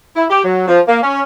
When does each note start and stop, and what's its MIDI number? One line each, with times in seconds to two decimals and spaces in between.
0.16 0.25 64
0.30 0.40 67
0.44 0.67 54
0.68 0.80 53
0.88 0.99 58
1.02 1.22 61